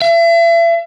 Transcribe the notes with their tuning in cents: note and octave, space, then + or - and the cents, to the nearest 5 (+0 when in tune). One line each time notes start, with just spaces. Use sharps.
E5 +40